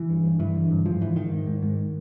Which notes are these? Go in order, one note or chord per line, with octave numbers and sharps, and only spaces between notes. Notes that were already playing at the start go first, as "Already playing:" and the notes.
Already playing: E3
G2
G2
G2 E3
D3
G2
G#2 F3
G#2 E3
G#2 D#3
G#2
G#2
G#2